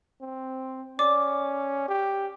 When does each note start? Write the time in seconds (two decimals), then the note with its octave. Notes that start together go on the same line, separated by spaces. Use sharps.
0.21 C4
0.99 C#4 D5 D6
1.88 G4